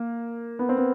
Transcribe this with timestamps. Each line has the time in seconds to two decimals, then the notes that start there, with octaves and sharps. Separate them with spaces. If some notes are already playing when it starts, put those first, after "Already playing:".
Already playing: A#3
0.59 B3
0.69 C4
0.78 B3